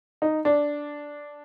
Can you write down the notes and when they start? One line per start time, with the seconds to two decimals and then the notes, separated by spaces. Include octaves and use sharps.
0.22 D#4
0.45 D4